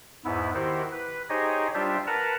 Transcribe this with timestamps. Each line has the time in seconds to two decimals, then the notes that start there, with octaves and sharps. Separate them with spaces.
0.25 E2 G#2 B3 E4
0.54 D#3 E4 F#4 G4 C5
0.92 B4
1.29 D#4 G4 G#4 C5 C#5 D#5
1.74 G3 D4 F4 G4 C5 E5
2.07 A#4 B4 F#5 A5 A#5